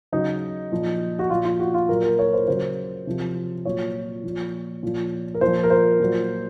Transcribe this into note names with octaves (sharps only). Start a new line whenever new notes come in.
C#3 F#3 D#4
A#2 F3
F#4
A#2 F3 F4
F4
F#4
F4
A#2 F#3 A#4
A#4
C#5
C5
C#3 F#3 C5
C3 F3
A#2 F#3 C#5
A#2 F3
A#2 F3
A#4
A#2 F3 C5
A#4
C5
A#2 F#3